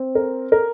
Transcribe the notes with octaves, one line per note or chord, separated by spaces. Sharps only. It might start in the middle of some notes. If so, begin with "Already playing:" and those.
Already playing: C4
A#4
A#4